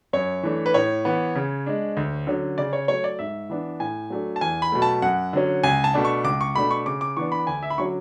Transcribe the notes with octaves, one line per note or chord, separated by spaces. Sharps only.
F#2 C#5
E3 A3 D4
B4
A2 C#5
E3 B3
C#3
G#3 D4
D2
D3 F#3 C#4
C#3 D5
C#5
F#3 A3 C#5
D5
G#2 E5
E3 B3 D4
A2 G#5
F#3 A3 D4
A5
E2 G#5
B5
B2 F#3 A3
A5
F#2 F#5
D3 F#3 C#4
C#2 G#5
A5
B2 A3 D4
C#6
C#2 D6
C#6
B2 A3 D4 B5
C#6
C#3 D6
D6
E3 B3 D4 C#6
B5
D2 G#5
E5
B5
D3 F#3 C#4 C#6